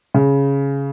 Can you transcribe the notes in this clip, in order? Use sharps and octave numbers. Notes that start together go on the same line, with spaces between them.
C#3